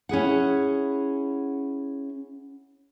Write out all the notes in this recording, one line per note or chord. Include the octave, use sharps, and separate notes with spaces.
C#4 E4 G#4 F#5